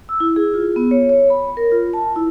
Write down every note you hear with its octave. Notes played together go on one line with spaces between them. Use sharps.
E6
E4
G#4
F4
B3
C#5
C#5
B5
A#4
F4
A5
E4